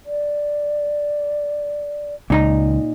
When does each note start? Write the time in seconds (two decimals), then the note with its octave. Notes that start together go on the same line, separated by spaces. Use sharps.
0.06 D5
2.30 C#2 A#2 D#4 A#5